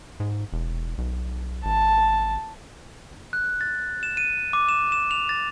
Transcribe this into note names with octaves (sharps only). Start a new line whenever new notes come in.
G#2
E1
B1
G#1 A5
F#6
A6
E7
D#7
D6
E7
E7
F7
A6